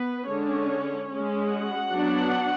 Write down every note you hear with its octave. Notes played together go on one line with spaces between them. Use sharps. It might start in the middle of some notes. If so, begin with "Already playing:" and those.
Already playing: B3 B4
D3 G#3 C#4 D4 C#5
G#3 C#4
F#4 F#5
F#3 B3 D4